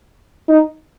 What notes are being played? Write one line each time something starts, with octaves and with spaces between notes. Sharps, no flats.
D#4